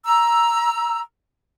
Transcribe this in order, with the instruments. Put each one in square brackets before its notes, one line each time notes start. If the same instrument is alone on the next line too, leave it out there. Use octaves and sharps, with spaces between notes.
[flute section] A#5 E6